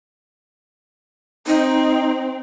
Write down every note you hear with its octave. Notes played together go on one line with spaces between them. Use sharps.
C4 D#4